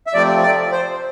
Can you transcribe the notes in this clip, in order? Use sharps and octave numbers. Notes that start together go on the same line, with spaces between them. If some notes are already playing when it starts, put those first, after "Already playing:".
E5
C3 F3 A3 C4 D5
D5
C5